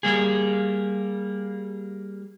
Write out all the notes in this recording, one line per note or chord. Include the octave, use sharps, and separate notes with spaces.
G3 A#3 G#4